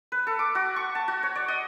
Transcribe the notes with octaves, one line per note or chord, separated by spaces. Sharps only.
B4
A4
D6
F#4
C#6
A5
F#4
C#5
D5
D#5